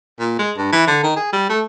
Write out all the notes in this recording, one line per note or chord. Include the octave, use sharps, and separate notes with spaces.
A#2
G#3
G2
E3
D3
D#3
G#4
G3
A3